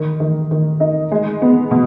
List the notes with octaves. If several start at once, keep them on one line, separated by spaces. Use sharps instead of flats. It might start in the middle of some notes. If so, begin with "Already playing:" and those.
Already playing: D#3
D#3
D#3
D#4
G#3
B3
B2